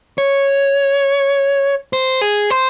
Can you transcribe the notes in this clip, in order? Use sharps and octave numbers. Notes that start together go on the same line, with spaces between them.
C#5
C5
G#4
C5